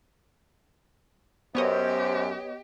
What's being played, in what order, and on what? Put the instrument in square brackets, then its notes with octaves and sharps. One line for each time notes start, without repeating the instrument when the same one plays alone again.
[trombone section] F#2 [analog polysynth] B3 C#5 D#5 [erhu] G4 [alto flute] C5